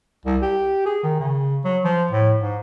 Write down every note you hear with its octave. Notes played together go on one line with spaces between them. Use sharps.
C2
G4
G#4
D#3
C#3
F#3
F3
A2
G#2